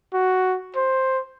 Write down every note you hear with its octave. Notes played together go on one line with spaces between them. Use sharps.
F#4
C5